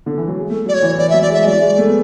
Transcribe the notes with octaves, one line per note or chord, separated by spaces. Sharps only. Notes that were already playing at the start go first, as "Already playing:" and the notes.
D3
E3
F#3
G#3
A3
F#3
D5
C#5
E3
E3 D5
F#3 E5
D5
G#3
E5
F#3 D5
G#3
A3
B3